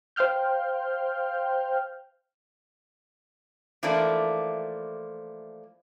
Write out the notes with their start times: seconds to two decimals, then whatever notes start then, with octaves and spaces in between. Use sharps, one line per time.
0.16 C5 F5 G5 F6 G6
3.83 E3 F3 A3 A#3 D4 D5